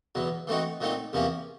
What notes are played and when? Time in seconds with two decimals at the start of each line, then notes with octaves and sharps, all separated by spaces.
0.15 E2 B2 F#3
0.47 E3 A3 C4 D#4 F#4
0.80 A#2 F#3 A3 C4 D#4
1.13 E2 C3 F3 A#3 C#4